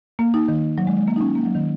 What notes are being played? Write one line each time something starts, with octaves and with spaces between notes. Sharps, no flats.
A#3
D#4
D#3
F#3
G#3
G#3
A#3
D#4
C#4
A#3
F#3
D#3